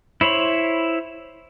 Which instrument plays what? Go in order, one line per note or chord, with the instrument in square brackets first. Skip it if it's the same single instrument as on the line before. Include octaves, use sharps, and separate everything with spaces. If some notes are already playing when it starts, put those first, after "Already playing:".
[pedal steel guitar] E4 C5 C#5 B5